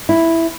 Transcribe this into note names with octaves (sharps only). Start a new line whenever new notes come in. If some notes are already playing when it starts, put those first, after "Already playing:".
E4